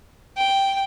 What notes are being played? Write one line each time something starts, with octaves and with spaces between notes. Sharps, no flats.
G5